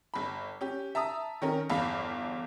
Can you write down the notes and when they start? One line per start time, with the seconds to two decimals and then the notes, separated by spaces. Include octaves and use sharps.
0.14 G1 B5
0.61 C#4 G4
0.95 E5 A5 A#5 D#6
1.42 D#3 C#4 A#4
1.70 G1 E2 F5 B5